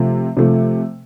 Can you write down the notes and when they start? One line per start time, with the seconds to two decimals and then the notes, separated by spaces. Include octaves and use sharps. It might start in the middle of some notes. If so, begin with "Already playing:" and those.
Already playing: C3 F3 A3
0.37 C3 F3 A3